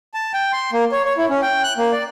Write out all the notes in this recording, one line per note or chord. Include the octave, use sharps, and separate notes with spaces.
A5
G5
C6
A#3
C#5
C#5
E4
C#4
G5
F#6
A#3
D5